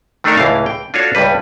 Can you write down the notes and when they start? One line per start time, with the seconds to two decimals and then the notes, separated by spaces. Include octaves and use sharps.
0.24 D#3 A3 D4 D#4 A4 A#4
0.37 C#2 A2 E3 F5
0.66 G5
0.94 D4 F4 F#4 A4 C#5
1.15 C#2 G2 G3 B4